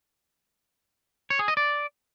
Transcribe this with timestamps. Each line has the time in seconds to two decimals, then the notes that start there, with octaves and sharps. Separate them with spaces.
1.30 C#5
1.39 G#4
1.48 D#5
1.57 D5